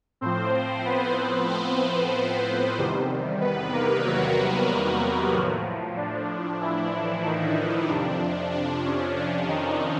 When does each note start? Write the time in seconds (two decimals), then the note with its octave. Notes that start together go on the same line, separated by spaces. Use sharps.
0.21 A2 F3 C4 C5
0.85 B3 B4
1.18 C4 C5
1.50 C4 C5
2.77 E2 C3 D#3 G3
3.41 B3 B4
3.73 A#3 A#4
4.05 F#3 F#4
5.33 A2 F3
5.97 D4
6.61 E3 E4
6.93 E3 E4
7.24 D#3 D#4
7.88 F2 C3 F3 D4
8.52 D4
8.85 C#4
9.17 D4
9.48 D#3 D#4